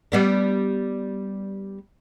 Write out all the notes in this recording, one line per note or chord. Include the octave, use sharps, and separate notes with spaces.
G3 B3 D4